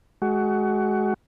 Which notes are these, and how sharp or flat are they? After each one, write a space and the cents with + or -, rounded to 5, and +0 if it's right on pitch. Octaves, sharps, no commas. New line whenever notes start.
G#3 +25 F#4 +20